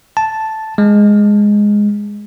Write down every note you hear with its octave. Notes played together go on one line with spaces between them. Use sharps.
A5
G#3